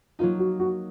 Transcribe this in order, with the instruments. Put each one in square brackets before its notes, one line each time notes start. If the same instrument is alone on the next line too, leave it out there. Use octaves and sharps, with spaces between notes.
[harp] F#3 A#3 D#4 [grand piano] F4
[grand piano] F#4
F#4